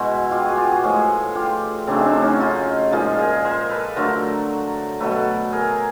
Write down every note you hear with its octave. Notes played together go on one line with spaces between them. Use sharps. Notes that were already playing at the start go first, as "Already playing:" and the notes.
Already playing: B2 G#3 E4 F#4
F4 G4
F#4 G#4
F4 G4
F#4 G#4
A2 F3 G#3 F#4 G#4
F4 G4
C#3 F#3 A3 C4 D4
D#4
C4 D4
C#4 D#4
D#4 F4
A#2 F3 G#3 D#4 F4
G#4 A#4
A#4 C5
A4 B4
D3 F#3 A3 A#4 C5
B2 F#3 A3 A4 B4
G#4 A#4